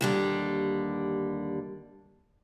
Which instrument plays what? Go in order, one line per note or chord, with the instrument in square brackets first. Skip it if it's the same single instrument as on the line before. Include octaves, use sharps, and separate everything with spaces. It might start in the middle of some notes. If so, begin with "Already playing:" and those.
[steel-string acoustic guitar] D#2 D3 G3